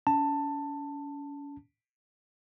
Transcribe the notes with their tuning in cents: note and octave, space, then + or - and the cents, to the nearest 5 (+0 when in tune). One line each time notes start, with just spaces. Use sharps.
C#4 +40 A5 +15